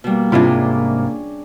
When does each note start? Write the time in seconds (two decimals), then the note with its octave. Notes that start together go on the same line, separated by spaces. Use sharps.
0.04 B2 G3 A#3
0.32 C2 G#2 C3 C#4 D4 E4 F4 G#4